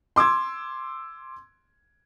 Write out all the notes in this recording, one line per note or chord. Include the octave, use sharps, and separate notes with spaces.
C6 D6 E6 G#6